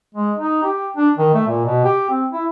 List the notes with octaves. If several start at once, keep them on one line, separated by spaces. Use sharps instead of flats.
G#3
D#4
G4
D4
D#3
A3
A#2
B2
G4
C4
E4